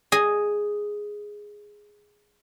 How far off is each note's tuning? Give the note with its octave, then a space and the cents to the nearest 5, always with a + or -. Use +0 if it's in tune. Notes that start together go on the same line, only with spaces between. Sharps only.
G#4 +0 D#5 +0